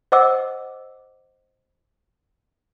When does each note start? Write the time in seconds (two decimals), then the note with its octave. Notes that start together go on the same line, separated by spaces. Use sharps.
0.12 C5 D#5 F#5 D6 E6